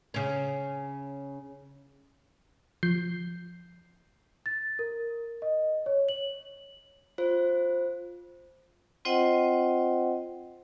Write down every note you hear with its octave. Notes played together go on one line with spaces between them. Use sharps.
C#3 C#4
F3 G6 C7
A6
A#4
D#5
C#5
F#7
F4 C5
C4 F4 C5 D#5 F#5 G5